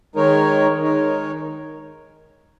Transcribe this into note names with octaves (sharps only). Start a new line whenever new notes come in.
D#3 G#3 D#4 A#4 C#5
D#3 G#3 D#4 A#4 C#5